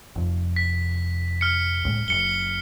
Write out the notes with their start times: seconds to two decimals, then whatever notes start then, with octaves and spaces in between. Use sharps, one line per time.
0.16 F1 F2
0.56 B6
1.41 F6 C#7
1.85 C#2 A2 G#3
2.08 F#1 F#2 C#7 G7